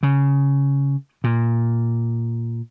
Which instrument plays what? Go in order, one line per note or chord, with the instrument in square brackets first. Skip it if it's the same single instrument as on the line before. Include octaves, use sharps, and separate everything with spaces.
[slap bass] C#3
A#2